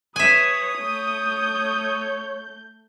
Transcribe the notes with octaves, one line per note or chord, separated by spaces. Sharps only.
B4 C#5 E5 G#5 D#6
A3 C#5 G6